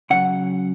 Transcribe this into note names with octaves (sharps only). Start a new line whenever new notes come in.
C#3 F#3 F#5